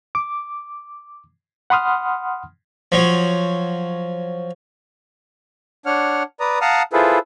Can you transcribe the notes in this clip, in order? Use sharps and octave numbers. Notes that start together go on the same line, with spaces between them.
D6
F#5 B5 C6 D#6 F6
F3 F#3
D4 C#5 F#5 F6
B4 D5 A#5 D#6
F5 F#5 A5 A#5 D#6 F6
E4 F4 G#4 A4 B4 C5